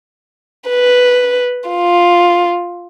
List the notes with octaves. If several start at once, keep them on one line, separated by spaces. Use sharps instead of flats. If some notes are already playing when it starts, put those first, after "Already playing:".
B4
F4